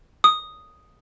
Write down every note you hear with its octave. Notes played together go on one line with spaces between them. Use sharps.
D#6